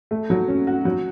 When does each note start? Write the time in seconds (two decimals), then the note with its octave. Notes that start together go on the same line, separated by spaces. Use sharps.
0.11 A3
0.30 F#3
0.48 C#4
0.67 F#4
0.85 F#3